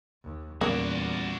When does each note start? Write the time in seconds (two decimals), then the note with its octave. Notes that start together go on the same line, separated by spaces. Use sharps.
0.23 D#2
0.61 E2 A#2 G3 A#3 B3 C#4 F#4 D5